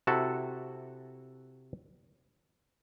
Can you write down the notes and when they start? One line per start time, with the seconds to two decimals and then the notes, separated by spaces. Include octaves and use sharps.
0.07 C3 E4 F#4 A4 A5